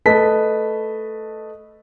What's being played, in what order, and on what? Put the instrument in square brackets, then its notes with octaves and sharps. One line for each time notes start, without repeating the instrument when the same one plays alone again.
[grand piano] A3 B4 D#5 A5 B6